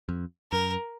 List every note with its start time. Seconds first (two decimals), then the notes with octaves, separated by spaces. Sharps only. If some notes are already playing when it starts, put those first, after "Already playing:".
0.09 F2
0.52 F#2 A#4